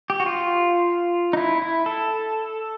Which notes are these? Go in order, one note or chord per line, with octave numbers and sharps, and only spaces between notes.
G4
F#4
F4
D#4
E4
E4
A4